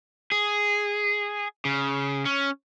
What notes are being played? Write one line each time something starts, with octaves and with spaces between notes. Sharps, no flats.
G#4
C#3
C#4